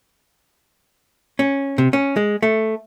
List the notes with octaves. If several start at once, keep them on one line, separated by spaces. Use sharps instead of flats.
C#4
C3
C#4
G#3
A3